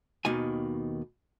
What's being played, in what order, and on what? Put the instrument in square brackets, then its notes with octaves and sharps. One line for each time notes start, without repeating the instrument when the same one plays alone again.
[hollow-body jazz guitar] D#2 B2 D#3 G#5